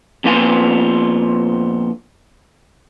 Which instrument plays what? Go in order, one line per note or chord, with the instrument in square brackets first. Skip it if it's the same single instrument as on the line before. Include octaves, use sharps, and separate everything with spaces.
[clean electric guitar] F2 A#2 B3 F4 G#5